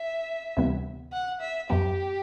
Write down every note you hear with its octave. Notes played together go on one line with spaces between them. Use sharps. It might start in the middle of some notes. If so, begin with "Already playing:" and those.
Already playing: E5
D2 C3 E3 G3 B3
F#5
E5
F#2 F#3 B3 G4